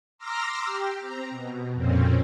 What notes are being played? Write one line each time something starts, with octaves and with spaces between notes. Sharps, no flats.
A#5 C6 D6 E6 F6 A#6
G4
C4 A#5
B2
F2 A#2 C4 C#4